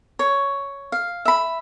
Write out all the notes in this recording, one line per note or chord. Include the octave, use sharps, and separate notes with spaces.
C#5
F5
E5 B5